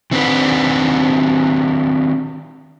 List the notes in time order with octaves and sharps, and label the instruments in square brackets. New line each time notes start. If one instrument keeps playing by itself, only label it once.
[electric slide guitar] D#3 C4 D4 B4